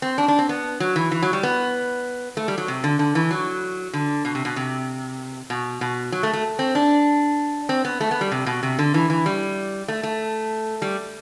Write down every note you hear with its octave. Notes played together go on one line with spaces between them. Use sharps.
C4
D4
D4
C4
B3
F#3
E3
E3
F#3
G3
B3
A3
G3
F#3
C3
D3
D3
E3
F#3
D3
B2
C3
B2
C3
B2
B2
F#3
A3
A3
C4
D4
C4
B3
A3
B3
G3
C3
B2
C3
D3
E3
E3
G3
A3
A3
G3